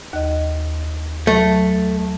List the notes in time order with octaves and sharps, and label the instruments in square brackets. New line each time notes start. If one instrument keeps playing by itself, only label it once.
[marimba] D#2 D#5
[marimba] F#3 [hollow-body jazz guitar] A3